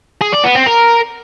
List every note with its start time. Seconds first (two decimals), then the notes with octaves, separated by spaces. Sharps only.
0.21 G#4
0.32 D5
0.44 B3
0.55 C4
0.66 A#4